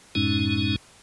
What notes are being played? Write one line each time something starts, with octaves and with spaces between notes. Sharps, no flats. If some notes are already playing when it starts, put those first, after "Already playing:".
F#2 A2 G#3 C#4 D#4